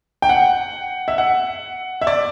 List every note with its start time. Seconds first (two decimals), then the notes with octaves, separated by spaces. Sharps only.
0.22 G5
0.29 F#5
1.08 E5
1.18 F#5
2.02 E5
2.07 D5